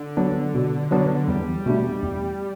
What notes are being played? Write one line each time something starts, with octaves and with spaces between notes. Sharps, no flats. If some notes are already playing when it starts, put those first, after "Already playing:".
Already playing: D3
F#3 B3 D4
B2
F#3 B3 D4
E2 G3
B2 A3 D4
E2